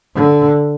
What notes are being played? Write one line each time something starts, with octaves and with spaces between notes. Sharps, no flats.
D3